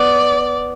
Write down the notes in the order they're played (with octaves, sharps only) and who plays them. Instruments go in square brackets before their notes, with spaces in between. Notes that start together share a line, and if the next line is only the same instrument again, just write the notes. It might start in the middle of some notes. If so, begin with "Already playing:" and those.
Already playing: [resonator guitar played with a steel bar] B3 [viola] D5